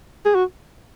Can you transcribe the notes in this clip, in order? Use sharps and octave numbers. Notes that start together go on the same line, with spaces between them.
G#4
F#4